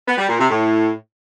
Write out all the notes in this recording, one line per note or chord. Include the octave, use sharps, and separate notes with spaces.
B3
G3
A#2
C3
A2